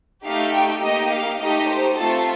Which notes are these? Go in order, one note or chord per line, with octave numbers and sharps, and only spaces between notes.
A3 D#4 G4 F5
G5
A#3 D#4 G4 D#5
F5
A3 D#4 G4 D#5
C5
A3 C4 F4 A4 A5